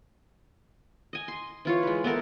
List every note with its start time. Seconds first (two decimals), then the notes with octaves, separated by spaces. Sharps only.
1.13 D#5 G#5
1.28 C6
1.65 E3 F4 C#5
1.83 G#3 B4
2.04 B3 E4 A4 A#4